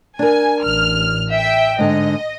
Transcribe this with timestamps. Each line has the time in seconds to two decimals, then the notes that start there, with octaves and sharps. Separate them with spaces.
0.19 D4 A#4 G#5
0.64 A1 F6
1.32 E5 G5
1.79 G#2 D3 D#5